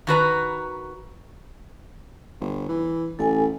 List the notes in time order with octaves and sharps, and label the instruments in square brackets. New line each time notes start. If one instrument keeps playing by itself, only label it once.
[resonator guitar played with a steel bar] D#3 F#4 B4 A#5
[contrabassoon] G1
E3
[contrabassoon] A1 [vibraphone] A4 G#5